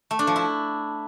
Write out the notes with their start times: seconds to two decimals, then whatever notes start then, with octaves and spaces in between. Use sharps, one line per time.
0.11 A3
0.19 D4
0.27 F3
0.36 E4